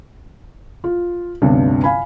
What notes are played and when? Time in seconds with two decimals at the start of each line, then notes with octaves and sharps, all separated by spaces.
0.84 F4
1.42 G1 D2 G2 C3 B3 C#4
1.84 F5 G#5 B5